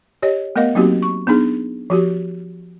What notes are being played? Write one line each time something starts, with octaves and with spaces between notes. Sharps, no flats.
G4 C#5 D#5
A3 B3 A#4 D#5 F5
F#3 A#3 C4 D#4 F#4 G4
C#6
B3 D4 D#4 G#4
F3 F#4 G4